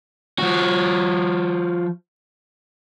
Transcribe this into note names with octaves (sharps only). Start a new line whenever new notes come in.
F3 F#4